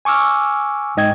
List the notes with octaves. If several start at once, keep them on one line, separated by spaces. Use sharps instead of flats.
G#5 C#6 D6 E6 F6
G#2 D#5 G5 G#6